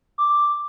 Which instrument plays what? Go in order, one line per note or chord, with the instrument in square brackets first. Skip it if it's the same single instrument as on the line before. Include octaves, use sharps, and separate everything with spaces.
[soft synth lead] D6